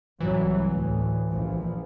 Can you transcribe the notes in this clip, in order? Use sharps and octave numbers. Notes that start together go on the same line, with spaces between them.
C2 E3 F#3
D2 A2
A#1 F3